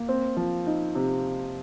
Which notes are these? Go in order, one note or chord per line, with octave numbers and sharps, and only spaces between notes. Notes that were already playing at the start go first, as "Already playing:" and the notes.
Already playing: A#3
C4
F3
D#4
C3